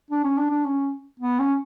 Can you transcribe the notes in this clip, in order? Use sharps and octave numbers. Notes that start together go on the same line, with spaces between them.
D4
C#4
D4
D4
C#4
B3
C#4